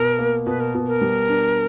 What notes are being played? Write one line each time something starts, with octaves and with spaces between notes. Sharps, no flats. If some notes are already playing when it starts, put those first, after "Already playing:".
Already playing: B2 A#4
A#3
B2 B4
A#4
B2
A#4
G3
D4